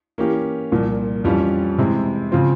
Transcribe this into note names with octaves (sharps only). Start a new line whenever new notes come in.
E3 A#3 C#4 G4
C2 A#2 F3
F2 E3 G3 C#4 F4
C3 E3 G#3 C4 E4
C#3 F3 C4 F4